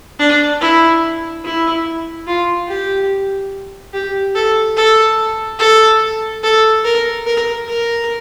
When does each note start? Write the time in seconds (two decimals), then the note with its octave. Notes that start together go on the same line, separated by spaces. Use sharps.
0.19 D4
0.61 E4
1.44 E4
2.27 F4
2.68 G4
3.93 G4
4.35 A4
4.77 A4
5.59 A4
6.43 A4
6.85 A#4
7.26 A#4
7.68 A#4